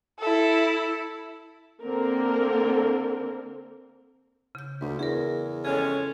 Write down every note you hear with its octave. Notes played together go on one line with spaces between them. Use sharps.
E4 A4
D3 A#3 C4 A#4
C#3 G6
D2 B4
E2 G#4 A#4
F2 G#3 C#4 A4